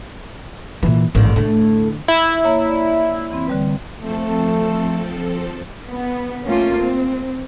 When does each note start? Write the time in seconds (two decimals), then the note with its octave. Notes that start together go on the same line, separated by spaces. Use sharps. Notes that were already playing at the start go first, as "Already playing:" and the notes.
0.83 A#2 E3
1.15 A1 G#2 D3 D#3 A#3
1.36 A2 D3 A3
2.08 E4
2.44 A#3 C#5
2.69 D5
3.31 E3 C4
3.47 D3 G3 B4
4.00 F3 A3 C4 A4
5.89 B3
6.44 A3 A#3 C#4 F4
6.79 C4